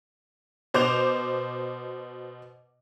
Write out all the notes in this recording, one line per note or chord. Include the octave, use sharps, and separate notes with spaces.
B2 C5 D6 G6 F7